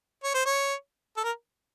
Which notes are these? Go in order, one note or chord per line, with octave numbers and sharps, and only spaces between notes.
C#5
C5
C#5
A4
A#4